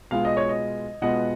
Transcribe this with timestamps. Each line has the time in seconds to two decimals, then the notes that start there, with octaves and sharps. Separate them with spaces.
0.11 B2 G#3 B3 F4 F5
0.25 D#5
0.37 C#5
0.49 D#5
1.02 B2 G#3 B3 F4 D#5 F#5